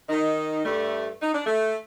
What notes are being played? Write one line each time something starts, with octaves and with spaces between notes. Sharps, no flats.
D#3 D#4
G2 G3 A3
D#4
D4
A3